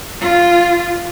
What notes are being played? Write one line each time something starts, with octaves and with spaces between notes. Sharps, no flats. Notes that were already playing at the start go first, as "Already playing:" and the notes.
F4